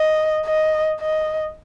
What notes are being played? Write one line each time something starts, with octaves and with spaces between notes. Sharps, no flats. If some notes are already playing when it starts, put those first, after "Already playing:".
Already playing: D#5
D#5
D#5